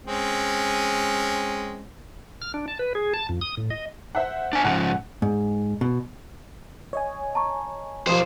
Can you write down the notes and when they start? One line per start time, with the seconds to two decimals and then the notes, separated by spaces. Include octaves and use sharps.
0.06 G#3 C4 C#4
2.42 F6
2.54 D4
2.68 A5
2.79 B4
2.95 G#4
3.14 A5
3.29 F2
3.41 D#6
3.57 A2
3.70 D#5
4.15 C5 E5 F#5
4.53 D4 G#5
4.64 G#2 C#3 F3 F#5
5.22 G#2
5.81 B2
6.93 C#5 D#5 G#5
7.35 A5 A#5 C#6
8.07 B1 F3 F4 G4 C5 D#5 D#6